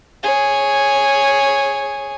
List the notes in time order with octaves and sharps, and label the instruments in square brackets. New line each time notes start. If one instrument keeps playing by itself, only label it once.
[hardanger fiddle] G#4 C#5